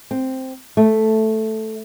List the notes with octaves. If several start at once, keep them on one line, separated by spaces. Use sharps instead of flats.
C4
A3